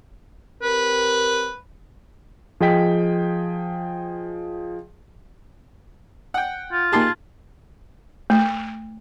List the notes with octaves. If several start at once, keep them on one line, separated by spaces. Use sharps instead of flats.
C4 G4 A#4 B4
F3 G#4 D#5 G5 B6
F#5 G5
F4
A#3 D#4 G4 G#4 A5 C6
A3